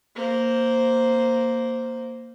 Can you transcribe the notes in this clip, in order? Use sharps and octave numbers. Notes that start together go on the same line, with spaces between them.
A#3 C5